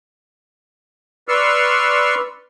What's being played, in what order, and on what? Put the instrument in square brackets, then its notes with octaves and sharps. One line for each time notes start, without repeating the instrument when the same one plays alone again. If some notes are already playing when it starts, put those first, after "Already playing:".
[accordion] B4 D5 C6 C#6 E6 F6